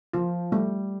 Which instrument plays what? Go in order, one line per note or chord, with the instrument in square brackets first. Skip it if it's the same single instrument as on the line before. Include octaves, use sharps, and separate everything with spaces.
[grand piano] F3 [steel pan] F4
[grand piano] G3 [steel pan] A3